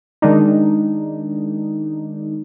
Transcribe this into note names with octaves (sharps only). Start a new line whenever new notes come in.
D#3 G#3 D4 D#4